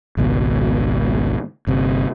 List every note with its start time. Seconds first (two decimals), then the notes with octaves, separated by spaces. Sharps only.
0.17 G#1 C#2 B2
1.67 G1 C3